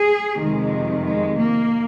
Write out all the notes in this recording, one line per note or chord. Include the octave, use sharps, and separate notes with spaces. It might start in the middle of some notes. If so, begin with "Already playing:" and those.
Already playing: G#4
F2 C3 D#3 G#3
G#3
A#3